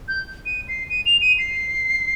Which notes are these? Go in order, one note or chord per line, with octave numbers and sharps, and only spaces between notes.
G6
D#7
C7
D#7
F7
D#7
C7